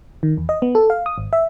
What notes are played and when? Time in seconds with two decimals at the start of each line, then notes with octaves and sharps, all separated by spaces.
0.23 D#3
0.37 E2
0.49 D#5
0.62 B3
0.75 A4
0.90 F5
1.06 D#6
1.18 G#1
1.33 E5